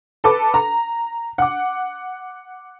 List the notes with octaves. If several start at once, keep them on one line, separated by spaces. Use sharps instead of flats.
A4 B4 D6
A#5
F#5 D6